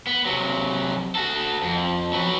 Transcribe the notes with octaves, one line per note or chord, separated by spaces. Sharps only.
B3
C3 F#3
F#4 A4
F2
F#3 B4